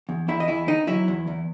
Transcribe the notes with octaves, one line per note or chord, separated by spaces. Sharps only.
E2
E2 E4 E5
D#5
E2 E4 E5
D#3 D#4 D#5
F#3 E4 E5
E2
E2